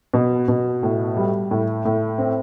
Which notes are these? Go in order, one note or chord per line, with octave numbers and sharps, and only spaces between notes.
B2
B2
A2
G3
A2
A2
C4